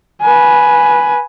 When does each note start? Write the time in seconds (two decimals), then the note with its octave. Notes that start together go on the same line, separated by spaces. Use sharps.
0.21 B4 G#5